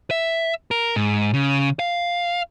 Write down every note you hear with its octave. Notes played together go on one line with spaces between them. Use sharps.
E5
A#4
G#2
C#3
F5